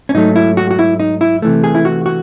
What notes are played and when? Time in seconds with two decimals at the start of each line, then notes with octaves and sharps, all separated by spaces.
0.09 C#4
0.14 G#2 F#3 A3 D#4
0.36 E4
0.57 F#4
0.71 F#4
0.79 E4
1.00 D#4
1.21 E4
1.42 C3 E3 A3
1.64 G#4
1.75 E4
1.85 F#4
2.06 F#4